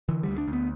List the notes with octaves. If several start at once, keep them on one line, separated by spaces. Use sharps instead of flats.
D3 E3
D2 G3
D4
D2
B3